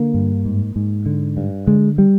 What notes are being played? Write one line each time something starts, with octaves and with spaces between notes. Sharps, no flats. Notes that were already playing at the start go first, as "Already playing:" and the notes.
Already playing: D3 A#3
G2
G#2
G#2
D3
G2
D3 G#3
G3